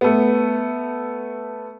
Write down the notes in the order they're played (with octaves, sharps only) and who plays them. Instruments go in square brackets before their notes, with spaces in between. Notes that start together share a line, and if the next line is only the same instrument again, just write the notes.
[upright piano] A3 B3